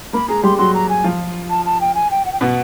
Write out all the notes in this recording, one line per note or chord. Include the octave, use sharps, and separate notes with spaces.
A#3 A#4 B5
G#3 G#4 A#5
G3 G4 C6
F#3 F#4 C6
A#5
G#5
F3 F4
A5
A5
G5
G#5
G5
F#5
G5
B2 B3 F#5